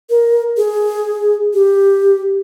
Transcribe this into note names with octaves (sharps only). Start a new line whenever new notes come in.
A#4
G#4
G4